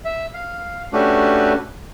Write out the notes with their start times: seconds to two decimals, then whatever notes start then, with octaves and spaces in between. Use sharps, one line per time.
0.05 E5
0.34 F5
0.93 A3 C#4 D4 F#4 G4 B4